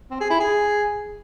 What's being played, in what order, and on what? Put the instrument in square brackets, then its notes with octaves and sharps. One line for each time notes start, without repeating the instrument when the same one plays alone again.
[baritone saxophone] C4
G#4
E4
G#4